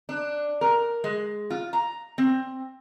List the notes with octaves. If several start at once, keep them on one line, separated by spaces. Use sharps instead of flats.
D4
A#4
G#3
F4
A#5
C4